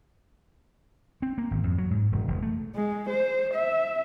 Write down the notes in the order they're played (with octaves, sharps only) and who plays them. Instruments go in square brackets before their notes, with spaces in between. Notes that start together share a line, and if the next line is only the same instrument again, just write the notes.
[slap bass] C4
A#3
G#1
F2
F#3
G#2
E1
E1
A3
[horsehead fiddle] G#3
C5
E5